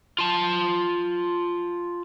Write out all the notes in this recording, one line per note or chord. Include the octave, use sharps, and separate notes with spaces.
F4 A5